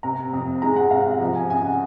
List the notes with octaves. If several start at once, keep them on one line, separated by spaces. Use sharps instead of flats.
C3 A#5
F2
G#3 A#5
F#5
C3 F5
F5
F3
G#5
C#3 G#5
F#5